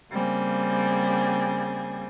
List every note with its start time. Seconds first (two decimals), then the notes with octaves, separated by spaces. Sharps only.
0.12 C#3 G3 A#3 C4 G#4